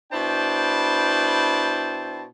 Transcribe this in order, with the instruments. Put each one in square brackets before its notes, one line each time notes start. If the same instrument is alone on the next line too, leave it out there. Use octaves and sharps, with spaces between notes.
[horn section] B2 D4 E4 C5 G5 A5